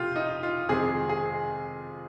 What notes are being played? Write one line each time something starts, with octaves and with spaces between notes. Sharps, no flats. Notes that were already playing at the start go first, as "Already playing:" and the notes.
Already playing: F1 F4 G4
D#4
F4
F2 C3 D#3 G#3 C4 G#4
G#4